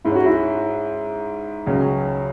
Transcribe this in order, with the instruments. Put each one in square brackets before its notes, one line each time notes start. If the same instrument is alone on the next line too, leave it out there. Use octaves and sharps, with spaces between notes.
[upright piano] G#2 G#3 C#4 [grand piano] E4
[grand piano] F#4
E4
[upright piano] C#2 C#3 F#3 C#4